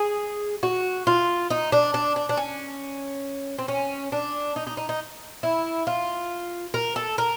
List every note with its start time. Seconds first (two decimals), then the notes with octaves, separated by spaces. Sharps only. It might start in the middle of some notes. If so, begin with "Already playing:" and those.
Already playing: G#4
0.63 F#4
1.07 F4
1.50 D#4
1.72 D4
1.94 D4
2.16 D4
2.29 D4
2.37 C#4
3.58 C4
3.68 C#4
4.12 D4
4.56 D#4
4.67 D#4
4.77 D#4
4.89 D#4
5.43 E4
5.87 F4
6.74 A#4
6.96 A4
7.18 A#4